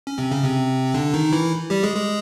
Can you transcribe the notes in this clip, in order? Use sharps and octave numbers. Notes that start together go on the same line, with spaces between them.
C#4
C3 C4
C#3 C#4
C3 C4
D3 D4
D#3 D#4
E3 E4
G3 G4
G#3 G#4
G#3 G#4